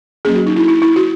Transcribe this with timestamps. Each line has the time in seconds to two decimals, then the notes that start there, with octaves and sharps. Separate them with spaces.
0.25 F#3 A#3 C#4 G#4
0.35 F#4
0.46 D#4
0.56 E4
0.68 E4
0.82 E4
0.96 F#4